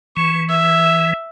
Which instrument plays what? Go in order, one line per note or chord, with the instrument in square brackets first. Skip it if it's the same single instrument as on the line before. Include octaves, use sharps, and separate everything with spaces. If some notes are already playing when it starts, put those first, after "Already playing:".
[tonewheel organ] E3 [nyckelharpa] C#6
[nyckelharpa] E5